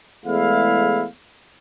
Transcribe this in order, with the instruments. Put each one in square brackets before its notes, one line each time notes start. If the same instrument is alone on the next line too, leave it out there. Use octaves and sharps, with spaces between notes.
[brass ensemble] E2 G#3 A3 E4 F5